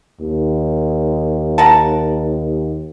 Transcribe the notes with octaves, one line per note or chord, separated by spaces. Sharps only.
D#2
A#4 F#5 A5